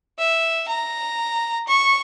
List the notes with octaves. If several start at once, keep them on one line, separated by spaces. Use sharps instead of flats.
E5
A#5
C#6